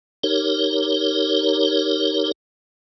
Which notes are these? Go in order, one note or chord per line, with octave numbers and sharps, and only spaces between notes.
D#4 G4 A#4 C#5